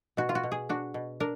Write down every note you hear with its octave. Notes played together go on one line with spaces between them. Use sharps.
B2 F#4
F4
F#4
B2
G#4
D4 F#4
B2
D4 A#4